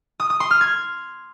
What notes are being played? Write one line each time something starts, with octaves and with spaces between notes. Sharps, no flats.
D#6
D#6
C6
F6
G#6